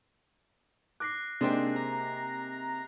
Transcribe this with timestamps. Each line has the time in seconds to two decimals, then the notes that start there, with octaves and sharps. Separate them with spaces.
1.00 D6 F#6 A#6 C7
1.41 C3 G#3 A#3 C4 D4 D#4 G4
1.76 A#5